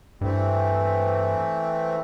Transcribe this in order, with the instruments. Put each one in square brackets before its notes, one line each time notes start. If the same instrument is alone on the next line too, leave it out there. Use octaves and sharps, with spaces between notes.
[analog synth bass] G2 [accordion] E3 A3 C4